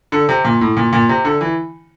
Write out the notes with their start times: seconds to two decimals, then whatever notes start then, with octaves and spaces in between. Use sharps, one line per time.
0.12 D3
0.29 C3
0.45 A#2
0.61 A2
0.77 A#2
0.93 A#2
1.09 C3
1.25 D3
1.41 E3